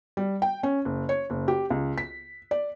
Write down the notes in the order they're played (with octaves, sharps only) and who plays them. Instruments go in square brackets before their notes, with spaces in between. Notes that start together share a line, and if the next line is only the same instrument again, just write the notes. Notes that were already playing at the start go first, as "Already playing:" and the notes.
[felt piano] G3
G5
C#4
F#1
C#5
F#1
G4
C#2
B6
D5